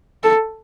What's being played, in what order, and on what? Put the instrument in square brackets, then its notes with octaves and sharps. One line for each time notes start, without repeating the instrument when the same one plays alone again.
[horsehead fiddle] A4